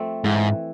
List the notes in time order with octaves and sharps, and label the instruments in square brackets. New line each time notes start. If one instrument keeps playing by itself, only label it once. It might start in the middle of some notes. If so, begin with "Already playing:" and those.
Already playing: [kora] F3 A3 C4
[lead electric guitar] G#2 [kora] E3